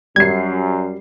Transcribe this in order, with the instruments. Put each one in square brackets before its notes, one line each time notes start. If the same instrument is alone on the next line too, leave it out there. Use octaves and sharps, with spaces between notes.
[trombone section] F#2 [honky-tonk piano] G3 C7 [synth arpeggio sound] G#6